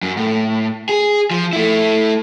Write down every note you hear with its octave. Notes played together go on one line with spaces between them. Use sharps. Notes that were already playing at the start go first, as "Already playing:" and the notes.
F#2
A2
G#4
F3
A3 E4